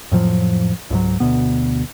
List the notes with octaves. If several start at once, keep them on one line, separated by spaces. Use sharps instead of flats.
F2 A2 F3 F#3
C#2 G#2 F#3
D2 B2 B3